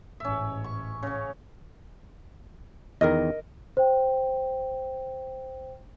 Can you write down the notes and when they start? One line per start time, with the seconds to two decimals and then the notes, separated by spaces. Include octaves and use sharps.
0.20 A1 G#2 C#4 E5
0.64 C#6
1.03 C#3 C#4
3.01 E2 D#3 A#4 D#5
3.77 C5 G5